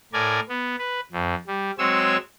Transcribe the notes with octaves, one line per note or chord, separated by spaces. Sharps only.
A2 A#4 D5 G#5
B3
B4
F2
G3
F#3 G#3 C4 C#5 G#5 E6